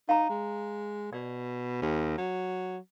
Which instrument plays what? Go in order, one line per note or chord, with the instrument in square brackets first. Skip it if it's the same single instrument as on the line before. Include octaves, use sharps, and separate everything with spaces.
[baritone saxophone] D#4 [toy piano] F5 A#5
[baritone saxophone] G#3
[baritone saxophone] B2 [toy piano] D5
[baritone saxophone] D#2
F#3